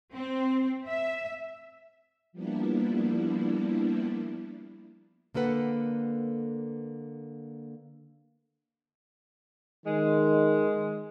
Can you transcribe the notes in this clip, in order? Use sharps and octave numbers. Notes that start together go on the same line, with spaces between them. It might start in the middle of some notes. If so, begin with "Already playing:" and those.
C4
E5
F3 G3 A#3 B3 D4 E4
D3 A#3 A4 B4 F#5
D#3 G#3